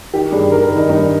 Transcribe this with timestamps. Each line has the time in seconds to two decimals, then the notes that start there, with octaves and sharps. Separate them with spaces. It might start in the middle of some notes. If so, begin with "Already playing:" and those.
0.14 D#3 G4
0.32 G2 G#4
0.52 D#3 A#4
0.64 A#4
0.70 D#3
0.77 D#4
0.89 G2 D#4